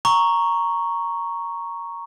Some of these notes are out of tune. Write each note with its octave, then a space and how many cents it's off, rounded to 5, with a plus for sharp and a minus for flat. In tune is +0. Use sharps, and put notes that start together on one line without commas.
A#5 +0 C#6 +0